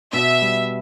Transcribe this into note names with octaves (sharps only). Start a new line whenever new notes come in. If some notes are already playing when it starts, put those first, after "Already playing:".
B2 E5
G3